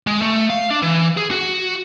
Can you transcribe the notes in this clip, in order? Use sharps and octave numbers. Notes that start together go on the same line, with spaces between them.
G#3
A3
F5
D4
E3
G#4
F#4